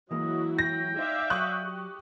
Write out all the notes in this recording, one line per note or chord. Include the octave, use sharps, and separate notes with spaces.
E3 F#3 G#3 A#3 E4 F#4 D#5
G5 A#6
D#4 C5 D5 E5 F5
F#3 C#6 D#6 F#6
G4